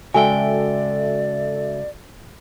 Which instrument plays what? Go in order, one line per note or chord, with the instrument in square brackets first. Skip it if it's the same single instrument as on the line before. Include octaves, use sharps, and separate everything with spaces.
[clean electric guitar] C#3 G#3 G5 [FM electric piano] F#4 A4 E5 [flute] D5 [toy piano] G#5